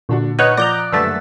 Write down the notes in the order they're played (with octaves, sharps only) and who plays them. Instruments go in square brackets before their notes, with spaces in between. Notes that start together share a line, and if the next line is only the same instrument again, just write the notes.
[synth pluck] A#2 [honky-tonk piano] D3 D4 F#4
[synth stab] D#4 B4 C#5 [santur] F#5 [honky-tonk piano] F6
[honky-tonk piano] F3 D6 D#6 [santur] D5 [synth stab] A#5 G6 A#6
[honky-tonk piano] F#1 [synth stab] G2 D3 A3 [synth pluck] E6 A6 B6